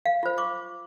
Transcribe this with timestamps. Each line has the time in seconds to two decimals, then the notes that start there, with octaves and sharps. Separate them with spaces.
0.06 F5
0.23 F4 C5
0.38 C#6 D6